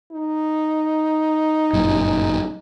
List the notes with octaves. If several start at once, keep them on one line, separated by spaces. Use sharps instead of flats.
D#4
G1 F#2 A#2